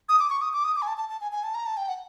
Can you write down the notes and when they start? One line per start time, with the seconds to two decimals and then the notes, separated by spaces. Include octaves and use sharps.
0.09 D#6
0.19 D6
0.30 C#6
0.41 D#6
0.53 D6
0.64 D#6
0.76 D6
0.82 G#5
0.87 A5
0.98 A5
1.09 A5
1.21 G#5
1.32 G#5
1.44 A5
1.55 A#5
1.66 A5
1.77 G5
1.89 F#5